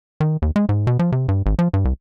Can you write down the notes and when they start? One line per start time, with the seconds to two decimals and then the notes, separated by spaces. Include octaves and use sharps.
0.20 D#3
0.42 D#2
0.56 G#3
0.69 G#2
0.87 B2
0.99 F3
1.12 C3
1.28 G2
1.46 G#1
1.59 F3
1.73 G2
1.85 C2